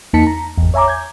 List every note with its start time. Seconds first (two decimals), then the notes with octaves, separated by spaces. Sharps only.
0.13 E2 A#3 D#4 A5 B6 C#7
0.27 A#5
0.58 G#1 E2
0.74 C#5 E5 G#5 A#5 D6
0.88 G6 G#6